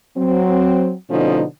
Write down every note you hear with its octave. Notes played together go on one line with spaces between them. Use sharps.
F#3 C4
B2 D3 F3 A3 C#4 D#4